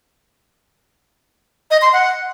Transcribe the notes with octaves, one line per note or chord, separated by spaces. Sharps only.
D#5
C6
F#5